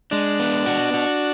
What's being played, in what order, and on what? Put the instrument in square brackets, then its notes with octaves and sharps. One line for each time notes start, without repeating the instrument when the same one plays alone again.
[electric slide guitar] G#3 [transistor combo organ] D4
[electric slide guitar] B3
F#4
F#4